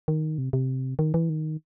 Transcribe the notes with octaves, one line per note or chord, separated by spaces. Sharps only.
D#3
C3
C3
D#3
E3
D#3